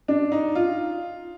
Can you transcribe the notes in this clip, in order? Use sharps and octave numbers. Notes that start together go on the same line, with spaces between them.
D4
D#4
F4